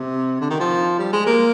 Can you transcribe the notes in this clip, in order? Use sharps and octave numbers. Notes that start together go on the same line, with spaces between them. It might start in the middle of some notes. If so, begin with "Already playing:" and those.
Already playing: C3
D3
D#3
F3
G3
G#3
A#3